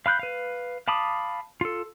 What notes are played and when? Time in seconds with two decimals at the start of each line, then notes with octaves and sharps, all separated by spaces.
0.06 F5 B5 F#6 G6
0.19 B4 F5
0.88 F5 A5 B5 D6 D#6
1.61 F4 A4